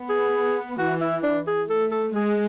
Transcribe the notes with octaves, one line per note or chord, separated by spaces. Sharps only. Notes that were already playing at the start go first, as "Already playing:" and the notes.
Already playing: B3
G#4
E3 F#4
E4
D4
G#4
A3 A4
A4
G#3 G#4